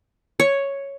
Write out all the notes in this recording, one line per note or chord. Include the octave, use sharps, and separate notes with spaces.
C#5